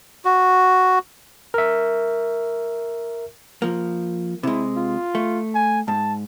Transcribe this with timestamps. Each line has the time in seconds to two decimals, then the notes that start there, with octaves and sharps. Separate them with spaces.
0.25 F#4
1.54 A#4 E5
3.62 F3 A#3
4.43 C3 G#3 E4
4.77 F4
5.15 A3
5.55 G#5
5.88 G#2 A5